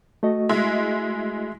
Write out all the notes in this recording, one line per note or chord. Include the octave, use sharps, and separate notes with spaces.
A3 F#4 D#5
G#3 E4